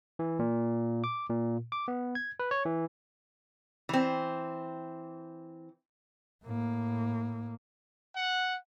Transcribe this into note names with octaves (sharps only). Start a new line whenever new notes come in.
E3
A#2
D6
A#2
D6
B3
G#6
B4
C#5
E3
E3 C4
A2 A#3
F#5